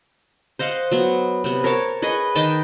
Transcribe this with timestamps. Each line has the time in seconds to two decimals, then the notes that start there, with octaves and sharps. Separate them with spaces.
0.59 C5 D#5 F5 F#5
0.92 F#3 B3
1.44 C3 B3
1.64 A#4 C#5 A5
2.02 G#4 B4 D#5 C#6
2.35 D#3 D#5 G5 A5